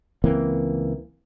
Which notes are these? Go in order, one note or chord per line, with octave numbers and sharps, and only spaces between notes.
C#2 E3 A#3 C4